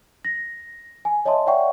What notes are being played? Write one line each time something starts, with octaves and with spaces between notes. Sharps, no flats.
A#6
G#5
C#5 D#5 E5 A5 C6
C#5 D5 E5 F#5 G5 C#6